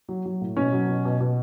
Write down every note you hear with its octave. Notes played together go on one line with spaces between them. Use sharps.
F#3
F#3
A2
B2 C#4
F#3
B2
B2
B2